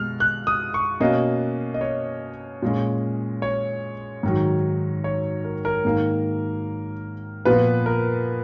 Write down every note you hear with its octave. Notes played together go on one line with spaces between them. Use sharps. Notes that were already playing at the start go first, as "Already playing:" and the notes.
Already playing: B2 G#3 F6
F#6
D#6
C#6
B2 A#3 C#4 D#5
D#5
C#5
A#2 G#3 C#4
C#5
G#2 D#3 F#3
C#5
A#4
A#4
G#2 D#3 A#3
A#2 F3 B3 B4
A#4